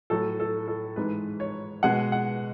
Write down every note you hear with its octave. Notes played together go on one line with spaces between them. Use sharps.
A2 F#3 A4
A4
A4
G#2 E3 G#3 B4
C#5
B2 G#3 F#5
F#5